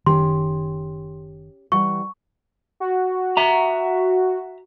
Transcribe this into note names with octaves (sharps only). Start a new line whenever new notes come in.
F#1 D#3 C#4 G4 C6
E3 G3 F#5 C#6
F#4
E5 A#5